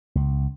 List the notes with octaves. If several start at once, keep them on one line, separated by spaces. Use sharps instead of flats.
C#2